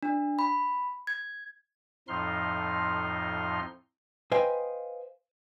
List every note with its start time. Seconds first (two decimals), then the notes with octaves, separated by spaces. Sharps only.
0.03 D4
0.39 B5
1.07 G#6
2.08 F2 A2 F3 D#4 C6 F6
4.32 B4 C5 D#5 F5 G5 G#5